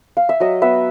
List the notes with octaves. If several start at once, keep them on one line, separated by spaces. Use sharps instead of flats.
F5
E5
F#3 D#5
B3 E5